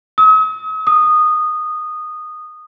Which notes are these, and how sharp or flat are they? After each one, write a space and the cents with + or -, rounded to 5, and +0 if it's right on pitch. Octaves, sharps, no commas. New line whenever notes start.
D#6 +45
D#6 -15